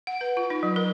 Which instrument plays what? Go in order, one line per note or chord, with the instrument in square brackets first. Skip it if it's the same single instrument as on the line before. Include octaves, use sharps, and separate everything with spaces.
[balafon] F#5
B4
F4
D#4
F#3
A#4